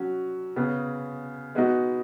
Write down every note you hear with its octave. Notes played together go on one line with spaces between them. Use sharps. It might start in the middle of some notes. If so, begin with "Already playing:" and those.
Already playing: F#3 C#4 F#4
C#3 B3 G#4
G#3 B3 D#4 F#4